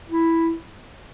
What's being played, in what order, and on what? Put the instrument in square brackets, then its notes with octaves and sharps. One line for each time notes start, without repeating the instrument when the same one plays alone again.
[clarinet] E4